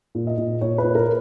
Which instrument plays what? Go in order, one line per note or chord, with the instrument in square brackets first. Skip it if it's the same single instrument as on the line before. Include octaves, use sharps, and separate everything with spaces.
[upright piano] A#2
D#5
A#2
A#2 C#5
B4
A#2
A#4